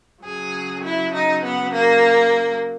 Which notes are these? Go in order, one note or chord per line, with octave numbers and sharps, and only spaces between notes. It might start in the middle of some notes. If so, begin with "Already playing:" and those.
C#3 F#3 G#4
E4
D#4
B3
A#3